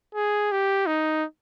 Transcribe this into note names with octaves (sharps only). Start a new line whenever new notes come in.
G#4
G4
D#4